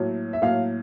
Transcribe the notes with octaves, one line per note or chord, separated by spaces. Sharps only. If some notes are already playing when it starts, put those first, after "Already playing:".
Already playing: A2 F#3 A#3
E5
A2 F#3 A#3 F5